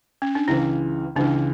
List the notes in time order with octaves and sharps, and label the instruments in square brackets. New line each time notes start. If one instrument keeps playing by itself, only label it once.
[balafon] C#4
D4
[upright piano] C#2 C#3 E3 [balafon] E4
[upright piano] C#2 C#3 E3 [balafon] D4